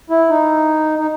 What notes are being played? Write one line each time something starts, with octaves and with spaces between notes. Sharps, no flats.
E4
D#4
D#4